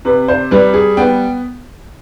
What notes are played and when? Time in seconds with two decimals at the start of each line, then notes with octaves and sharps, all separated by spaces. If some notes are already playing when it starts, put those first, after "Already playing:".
0.05 C3 B4
0.28 C5
0.51 G3 B4
0.74 G#4
0.97 B3 G5